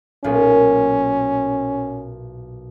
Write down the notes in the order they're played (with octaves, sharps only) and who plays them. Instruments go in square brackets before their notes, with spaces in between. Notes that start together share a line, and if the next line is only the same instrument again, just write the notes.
[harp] B1 A#2 B3 [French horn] C#4